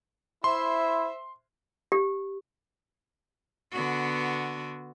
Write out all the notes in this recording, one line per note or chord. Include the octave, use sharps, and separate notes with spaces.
E4 C5 E5 C6
G4
D3 B3 F#4